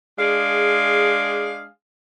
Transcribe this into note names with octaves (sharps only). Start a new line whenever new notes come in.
G#3 D4 G#4 F5